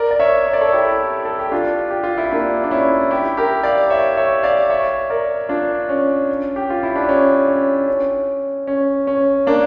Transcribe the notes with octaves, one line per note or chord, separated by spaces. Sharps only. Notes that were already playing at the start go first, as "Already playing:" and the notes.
Already playing: A#4 D5
D5
C#5 E5
C#5
D5
A4 C#5
E4 G4
A4
G4
D4 F4
G4
F4
E4
A#3 D4
D4
C#4 E4
E4 G4
G4 A#4
D5 F5
C#5 E5
C#5 E5
D5 F5
C#5 E5
A#4 D5
D4 F4
C#4
G4
F4
E4
D4
C#4
C#4
C#4
C#4
C#4
A#3 D4